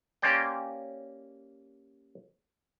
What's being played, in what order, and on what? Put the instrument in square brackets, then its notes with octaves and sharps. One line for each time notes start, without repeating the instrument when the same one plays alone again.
[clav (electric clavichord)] A#3 C#4 G4 C5 D5 G5